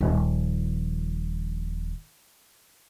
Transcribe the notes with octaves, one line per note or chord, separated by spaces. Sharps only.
D#1 F3